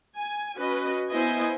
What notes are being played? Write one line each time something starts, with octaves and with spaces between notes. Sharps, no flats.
G#5
C#4 F#4 B4 D#5
B3 E4 C5 D#5 G#5